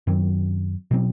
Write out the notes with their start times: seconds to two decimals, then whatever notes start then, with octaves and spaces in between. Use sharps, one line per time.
0.07 F#2 D#3 F#3 C4
0.91 B2 F#3 C4